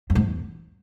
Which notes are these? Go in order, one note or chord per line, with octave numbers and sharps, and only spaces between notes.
F#2
G#2
E2